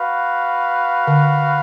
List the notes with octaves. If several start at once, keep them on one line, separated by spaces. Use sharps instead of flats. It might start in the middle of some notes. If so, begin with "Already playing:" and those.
Already playing: F#4 B4 F5
D3